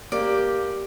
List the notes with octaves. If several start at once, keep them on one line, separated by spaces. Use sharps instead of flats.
A#3 G4 D5